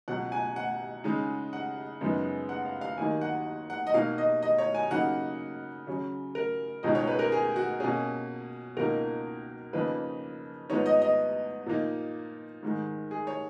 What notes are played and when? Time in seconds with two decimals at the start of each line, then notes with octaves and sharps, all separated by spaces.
0.08 C#2 B2 F#3 F#5
0.32 G#5
0.56 F#5
1.04 C#3 G#3 D#4
1.53 F#5
2.01 F#2 C#3 G#3 B3 D#4
2.49 F#5
2.65 F5
2.81 F5
2.98 D#2 D#3 F#3 A#3 D#4 G#5
3.21 F#5
3.70 F#5
3.87 D#5
3.94 B2 A#3 D#4 F5
4.18 D#5
4.43 D#5
4.58 C#5
4.74 G#5
4.90 C#3 F#3 A#3 D#4 F#5
5.87 C#3 F#3 C#4
6.35 A#4
6.83 C#2 B2 G#3 D#4 D#5
6.95 C#5
7.07 B4
7.19 A#4
7.32 G#4
7.56 F#4
7.80 B2 A#3 C#4 G#4
8.77 C#2 B2 A#3 D#4 A#4
9.73 F2 C#3 F3 A#3 D#4 B4
10.70 G#2 F3 B3 D#4 C#5
10.86 D#5
11.02 D#5
11.66 A#2 F3 A#3 D#4
12.63 G#2 D#3 G#3
13.11 G#4
13.27 C#5